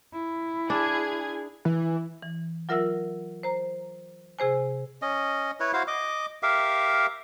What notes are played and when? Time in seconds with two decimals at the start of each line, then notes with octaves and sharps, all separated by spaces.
0.13 E4
0.70 D4 G#4 G#6
1.65 E3
2.22 E3
2.69 F#3 F4 A#4 E5 F#5 E6
3.43 C5 A#5
4.39 C3 G#4 C5 G#5
5.02 C#4 D#5
5.60 E4 B4 C#5
5.73 E4 F#4 C5 F5
5.88 D#5 D6
6.43 G4 A#4 E5 F5